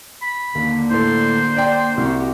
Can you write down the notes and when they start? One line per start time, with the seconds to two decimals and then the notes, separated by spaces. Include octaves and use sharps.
0.22 B5
0.55 D#2 D3 A#3
0.90 A2 A4 C5
1.56 D5 G5
1.97 C2 F#4 G4